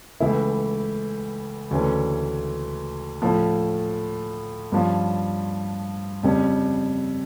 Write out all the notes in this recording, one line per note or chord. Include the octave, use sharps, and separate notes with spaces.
C#2 C#3 E3 A3 E4
D2 C#3 E3 A3 C#4
A2 F3 A3 C#4
G2 F3 C#4 F4
F2 C#3 G3 C#4